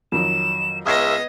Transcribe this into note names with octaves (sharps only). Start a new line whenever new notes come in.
F2 D#3 F#3 E7
C#2 B3 D#5 E5 D#6 G#6 C7